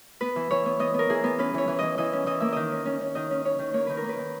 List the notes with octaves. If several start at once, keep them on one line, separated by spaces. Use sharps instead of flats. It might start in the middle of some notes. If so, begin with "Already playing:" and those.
B3 B4
E3
E3 C#5
B3
B3 D#5
B3 A#4
E3 G#4
B3
C#4 B4
E3 C#5
E3
E3 D#5
E3 D#5
C#4
E3 D#5
A#3 E5
D#3 D#5
C#4
C#4
C#4
D#3 D#5
C#4
C#4 C#5
D#3
A#3 C#5
D#3 B4
A#4
A#3 B4
D#3